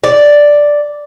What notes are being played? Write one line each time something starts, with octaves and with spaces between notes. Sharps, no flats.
D5